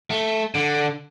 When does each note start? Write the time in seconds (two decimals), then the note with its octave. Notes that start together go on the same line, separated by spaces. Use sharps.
0.10 A3
0.55 D3